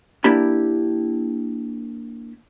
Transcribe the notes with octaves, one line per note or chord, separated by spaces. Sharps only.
A#3 D4 E4 G4 B5